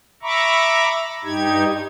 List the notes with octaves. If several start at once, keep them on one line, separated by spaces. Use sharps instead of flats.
E5 A#5 B5 C#6 D6
G2 D#4 G4 G#6